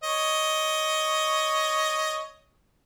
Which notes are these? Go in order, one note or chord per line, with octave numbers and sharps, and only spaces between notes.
C#5 D#5